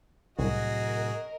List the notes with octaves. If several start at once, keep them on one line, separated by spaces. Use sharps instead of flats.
C2 A2 C3 F#3 F#4 G#4 A#4 D#5